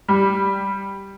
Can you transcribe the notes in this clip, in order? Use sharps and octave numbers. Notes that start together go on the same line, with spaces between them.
G3